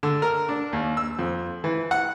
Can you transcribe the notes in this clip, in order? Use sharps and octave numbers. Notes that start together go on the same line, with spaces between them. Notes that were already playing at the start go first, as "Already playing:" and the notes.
D3
A#4
D4
D#2
E6
F2
E3
F#5